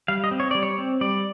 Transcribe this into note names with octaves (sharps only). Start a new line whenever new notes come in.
G3 F5
D#5
C4
C#5
G3 D5
C#5
C4
G3 D5